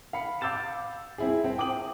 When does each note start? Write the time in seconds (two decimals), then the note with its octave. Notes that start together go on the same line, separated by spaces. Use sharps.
0.13 F5 B5 C#7
0.41 F5 D6 E6 G6 A6 E7
1.18 C4 E4 G#4
1.44 C4
1.58 G5 D6 D#6 F#7